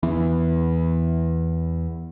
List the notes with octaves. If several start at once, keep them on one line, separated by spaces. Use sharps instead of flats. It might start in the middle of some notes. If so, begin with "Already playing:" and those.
E2 E3 B3